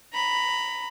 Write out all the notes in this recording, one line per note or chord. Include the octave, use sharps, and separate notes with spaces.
A#5 B5